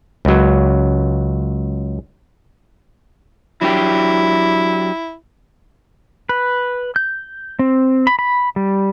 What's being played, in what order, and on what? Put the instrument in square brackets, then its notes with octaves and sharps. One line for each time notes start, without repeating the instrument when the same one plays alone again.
[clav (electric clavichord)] C#2 F#3
[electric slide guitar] F#3 D4 G4 [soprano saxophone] E4
[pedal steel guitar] B4
G6
C4
B5
B5
G3